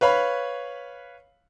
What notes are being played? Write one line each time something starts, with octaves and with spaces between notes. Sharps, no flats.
B4 C#5 F5 B5